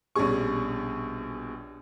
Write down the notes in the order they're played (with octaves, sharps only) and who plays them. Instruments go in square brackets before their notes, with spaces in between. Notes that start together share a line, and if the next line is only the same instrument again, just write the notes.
[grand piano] A#1 B2 G3 C#4 G#4 C#6